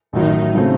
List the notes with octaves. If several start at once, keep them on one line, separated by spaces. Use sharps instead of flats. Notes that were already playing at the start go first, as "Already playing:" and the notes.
A1 A2 D#3 F#3 D#4
C#3 F#3 A3 C4